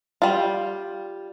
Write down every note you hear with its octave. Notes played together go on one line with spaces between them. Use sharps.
G3 F4